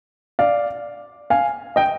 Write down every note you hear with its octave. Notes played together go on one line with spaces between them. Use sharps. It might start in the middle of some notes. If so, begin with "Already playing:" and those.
D5 F5
F5 G#5
D#5 G5